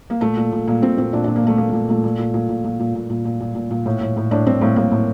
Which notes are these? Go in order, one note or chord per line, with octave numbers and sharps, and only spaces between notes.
A#3
A#2 A3
A#2
A#2
A#2 A#3
A#2 C4
A#2 C4
A#2 D4
A#2 D4
A#3
A#2 A3
A#2 A#3
A#2 A3
A#2 A3
A#2
A#2
A#2
A#2
A#2
A#2
A#2
A#2
A#2
A#2
A#2
A#2
A2
A2
A2
A2 D4
A2 C4
A2 A#3
A2 A#3
A2